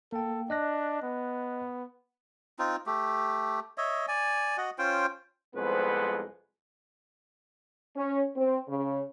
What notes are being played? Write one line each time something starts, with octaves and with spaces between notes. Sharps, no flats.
A#3 A4 G5
D4 D#5 F#6 A#6
B3
C4 D#4 F4
A3 G4
C#5 D#5 E5
D5 G#5
F#4 D#5 F#5
C#4 F4 C5 G5
C2 F2 G#3 B3 B4 C5
C#4
C4
C#3